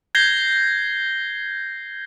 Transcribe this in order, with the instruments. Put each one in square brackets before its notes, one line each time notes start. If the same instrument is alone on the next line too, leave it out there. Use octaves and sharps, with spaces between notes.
[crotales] G6 G#6 A#6 C7 G7